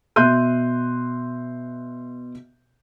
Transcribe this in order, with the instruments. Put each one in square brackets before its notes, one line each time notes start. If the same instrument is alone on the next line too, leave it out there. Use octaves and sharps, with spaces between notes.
[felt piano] B2 E5 C6 F#6 G6 D#7